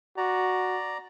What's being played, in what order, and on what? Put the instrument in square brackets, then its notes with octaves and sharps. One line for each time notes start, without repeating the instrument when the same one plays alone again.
[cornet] F#4 [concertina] D5 A#5